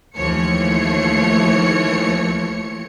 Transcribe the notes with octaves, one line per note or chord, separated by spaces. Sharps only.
D#2 E3 F3 A3 C#5 C#7